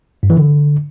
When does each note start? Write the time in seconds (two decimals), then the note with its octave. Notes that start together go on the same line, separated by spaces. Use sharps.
0.23 G2
0.30 E3
0.37 D3